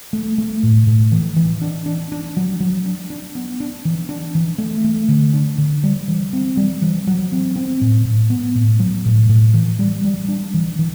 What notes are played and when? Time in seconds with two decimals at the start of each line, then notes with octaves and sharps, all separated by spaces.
0.13 A3
0.38 A3
0.63 A2
0.87 A2
1.12 E3
1.36 E3
1.62 D4
1.86 D4
2.12 D4
2.37 F#3
2.60 F#3
2.86 D4
3.10 D4
3.35 B3
3.60 D4
3.85 E3
4.09 D4
4.35 E3
4.58 A3
4.84 A3
5.08 D3
5.33 D4
5.58 D3
5.83 G3
6.08 E3
6.33 C4
6.57 G3
6.82 E3
7.07 F#3
7.32 C4
7.56 C4
7.81 A2
8.05 A2
8.30 B3
8.55 A2
8.80 F#3
9.06 A2
9.29 A2
9.54 E3
9.79 G3
10.05 G3
10.28 D4
10.54 E3
10.79 E3